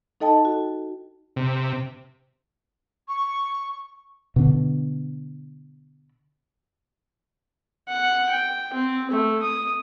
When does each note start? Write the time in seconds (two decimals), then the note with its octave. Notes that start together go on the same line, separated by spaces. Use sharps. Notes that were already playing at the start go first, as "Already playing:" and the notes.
0.20 D#4 A4 D#5 G5 A5
0.45 F#4 A4
1.36 C3
3.08 C#6
4.36 B2 D3
7.89 F#5
8.29 G5
8.73 C4
9.11 A3
9.42 D#6